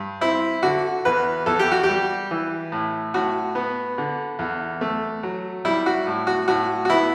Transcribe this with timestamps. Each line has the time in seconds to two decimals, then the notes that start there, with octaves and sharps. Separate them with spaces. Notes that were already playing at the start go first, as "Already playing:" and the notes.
Already playing: G2
0.21 C4 E4
0.63 D3 F#4
1.05 E2 B4
1.46 E2 A4
1.59 G4
1.72 F#4
1.83 G4
1.88 G3
2.31 E3
2.72 A2
3.14 A2 F#4
3.55 B3
3.98 D3
4.39 E2
4.81 A3
5.23 F#3
5.65 G3 E4
5.86 F#4
6.07 A2
6.27 F#4
6.48 A2 F#4
6.85 F#4
6.90 B3 E4